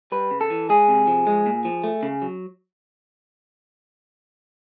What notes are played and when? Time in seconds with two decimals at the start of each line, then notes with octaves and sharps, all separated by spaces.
0.12 G3 B4
0.31 C#3
0.41 A4
0.50 E3
0.69 G#3 G#4
0.89 C3
1.07 F3
1.27 G#3
1.46 A#2
1.65 F3
1.84 A3
2.03 C#3
2.22 F#3